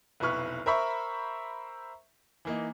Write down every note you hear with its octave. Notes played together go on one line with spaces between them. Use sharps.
F1 B1 E4 B4 C#6 F6
A#4 C5 E5 B5 C#6
E3 A#3 D#4